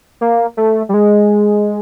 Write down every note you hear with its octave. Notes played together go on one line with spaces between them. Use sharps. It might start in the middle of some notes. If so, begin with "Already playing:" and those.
A#3
A3
G3
G#3